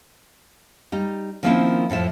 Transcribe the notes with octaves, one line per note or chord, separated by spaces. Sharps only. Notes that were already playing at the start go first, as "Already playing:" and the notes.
G3 D#4
D#3 F3 A#3 C4 C#4 E4
F2 A2 F3 E5